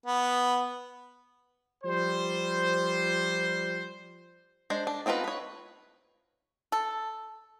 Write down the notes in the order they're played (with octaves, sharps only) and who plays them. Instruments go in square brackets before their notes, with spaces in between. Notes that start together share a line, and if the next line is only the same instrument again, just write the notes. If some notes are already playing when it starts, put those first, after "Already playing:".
[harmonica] B3
[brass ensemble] F3 G3 C5
[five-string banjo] G#3 D4 C5
D4
B3 C4 D#4 F4 B4
B4 C#5
[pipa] A4